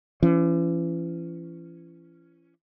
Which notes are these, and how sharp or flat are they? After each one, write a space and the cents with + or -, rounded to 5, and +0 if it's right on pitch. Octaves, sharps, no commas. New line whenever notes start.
E3 +40 C#4 +0